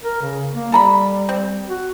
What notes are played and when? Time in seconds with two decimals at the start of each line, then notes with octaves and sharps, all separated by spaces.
0.03 A#4
0.22 C#3
0.53 A#3
0.72 G3 A4 A#5 B5
1.29 C4
1.69 F#4